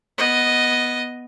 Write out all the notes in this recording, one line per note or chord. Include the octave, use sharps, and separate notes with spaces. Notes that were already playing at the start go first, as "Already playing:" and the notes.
B3 D#5